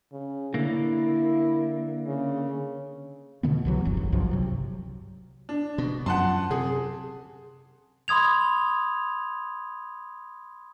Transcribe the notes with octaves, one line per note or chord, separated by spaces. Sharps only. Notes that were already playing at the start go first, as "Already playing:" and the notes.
C#3
D3 A#3 E4
C#3
B2 D3 E3 B3
C2 E3 F#3
E1 F#2
G#1
C2 G2 F3 F#3
C3 F#3
D4
B2
F#2 F3 F#5 A5 C6
C3 G#4
B5 C6 D#6 G#6 F7